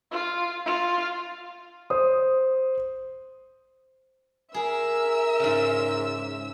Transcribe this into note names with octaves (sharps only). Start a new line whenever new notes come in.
F4
F4
C5 D#6
G#4 A#4 E5 E6
G#2 C#3